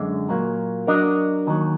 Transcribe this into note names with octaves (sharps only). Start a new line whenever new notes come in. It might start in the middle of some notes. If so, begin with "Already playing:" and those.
Already playing: F#2 D3 G#3
A#2 F#3 A#3
F#3 D4 F#4 A#4 D#5
D#2 D#3 F#3